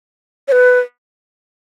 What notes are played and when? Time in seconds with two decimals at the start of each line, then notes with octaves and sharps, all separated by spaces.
0.48 C#5
0.52 B4